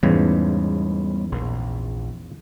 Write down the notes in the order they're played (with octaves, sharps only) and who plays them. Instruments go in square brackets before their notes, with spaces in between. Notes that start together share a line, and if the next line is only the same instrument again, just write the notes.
[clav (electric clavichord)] E2 G#2 C#3 [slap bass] F3 G3 B3
[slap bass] A#1